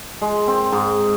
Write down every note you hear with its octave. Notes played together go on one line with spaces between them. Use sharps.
G#3
C4
G#2